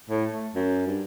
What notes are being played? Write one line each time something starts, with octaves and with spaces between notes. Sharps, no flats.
A2
A3
F#2
G2